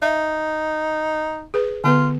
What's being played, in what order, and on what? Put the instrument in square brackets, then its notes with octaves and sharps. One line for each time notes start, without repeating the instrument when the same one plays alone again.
[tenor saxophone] D#4 [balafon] E5
[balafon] G#4 B4
[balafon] D3 B3 B4 [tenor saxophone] F4